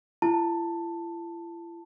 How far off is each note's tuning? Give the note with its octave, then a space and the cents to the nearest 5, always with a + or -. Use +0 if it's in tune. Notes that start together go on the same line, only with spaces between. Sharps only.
E4 +45 A5 +10